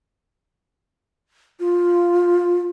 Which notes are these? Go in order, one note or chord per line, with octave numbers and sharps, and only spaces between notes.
F4